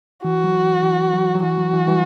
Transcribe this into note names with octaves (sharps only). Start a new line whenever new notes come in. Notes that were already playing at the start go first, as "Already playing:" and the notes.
E3 F#4
F#3
E3
E3
F#3
F#3
E3 F#4
F#3
E3
E3 G3